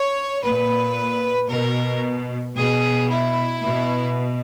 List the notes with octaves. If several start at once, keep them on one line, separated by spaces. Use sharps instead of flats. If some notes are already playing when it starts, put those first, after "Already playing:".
Already playing: C#5
A#2 B4
B2 A#4
B2 G#4
E4
B2